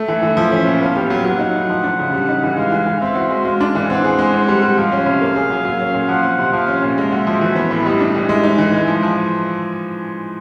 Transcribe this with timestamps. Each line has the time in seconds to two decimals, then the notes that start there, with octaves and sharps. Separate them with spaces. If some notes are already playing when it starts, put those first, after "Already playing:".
Already playing: A3 E5
0.08 E3
0.23 E3
0.37 F3
0.51 C#4
0.66 A#2
0.81 B3 F5
0.97 G4
1.10 F#3
1.25 F#3 F#5
1.39 D#4
1.55 A2
1.69 F3
1.84 D4
1.99 C#3
2.13 G3
2.29 D#4
2.43 E3
2.57 G#3 F5
2.72 E3
2.86 E3
3.01 C4 E5
3.15 F#4
3.31 G#3
3.45 G#3 F5
3.61 D4
3.75 E3
3.90 C4 F#5
4.04 G#4
4.19 G#3
4.34 C4
4.48 G3
4.62 G3
4.78 F3 F5
4.92 C#4
5.06 C3
5.22 A#3
5.36 G#4
5.50 F#3
5.65 F#3
5.81 C#4
5.94 A#2
6.09 F3 F#5
6.25 C4
6.39 C3
6.53 F3 F5
6.68 C#4
6.83 A#2
6.98 G#3 E5
7.12 F#4
7.27 F3
7.41 E3
7.56 B3
7.71 A2
7.86 G3 D#5
8.00 D4
8.15 E3
8.29 G#3 E5
8.44 D#4
8.58 E3
8.73 G#3
8.88 F3
9.03 F3